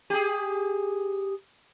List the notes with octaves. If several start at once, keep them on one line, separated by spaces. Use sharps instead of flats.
G4 G#4